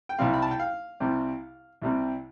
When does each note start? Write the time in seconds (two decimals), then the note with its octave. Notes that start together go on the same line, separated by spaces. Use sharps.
0.09 G5
0.19 C2 C3 G3 C4 F5
0.34 B5
0.42 A5
0.51 G5
0.60 F5
1.00 C2 C3 G3 C4
1.82 C2 C3 G3 C4